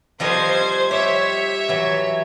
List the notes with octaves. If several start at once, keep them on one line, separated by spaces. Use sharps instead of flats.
F3 G3 C5 D#5 G#6
G4 C#5 E5
E3 F#3 C#5